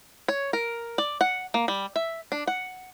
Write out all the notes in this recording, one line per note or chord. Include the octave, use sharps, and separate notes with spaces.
C#5
A#4
D5
F#5
A#3
G3
E5
D4
F#5